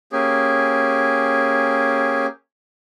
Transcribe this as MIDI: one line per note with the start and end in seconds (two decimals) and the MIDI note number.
0.12 2.26 58
0.12 2.26 61
0.12 2.26 67
0.12 2.26 68